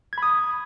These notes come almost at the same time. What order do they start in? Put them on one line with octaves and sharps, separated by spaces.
G#6 B5 D#6